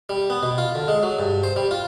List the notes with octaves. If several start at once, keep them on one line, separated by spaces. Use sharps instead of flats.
G3
B3
B2
F4
D3
G#3
F#3
G2
C5
G3
F4